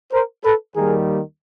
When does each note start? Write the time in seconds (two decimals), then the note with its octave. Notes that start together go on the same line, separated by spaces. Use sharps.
0.12 A#4 C5
0.44 A4 B4
0.76 D#2 D#3 G3 A#3 G#4 A#4